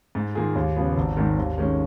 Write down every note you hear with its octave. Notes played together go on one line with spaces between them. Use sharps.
G#2
D#3 A#3 F4 G#4
D#2
C#3 F3 B3
G#1
G#2 D#3
D#2
D#3 G#3 C#4